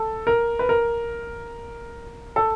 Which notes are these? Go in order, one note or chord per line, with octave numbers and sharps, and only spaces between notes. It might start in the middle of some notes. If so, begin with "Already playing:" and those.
Already playing: A4
A#4
B4
A#4
A4